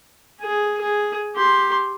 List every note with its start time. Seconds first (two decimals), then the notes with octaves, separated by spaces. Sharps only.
0.42 G#4
0.81 G#4
1.36 G4 C6